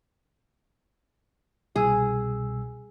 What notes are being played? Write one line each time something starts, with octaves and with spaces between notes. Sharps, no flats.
C2 B2 G#4 E6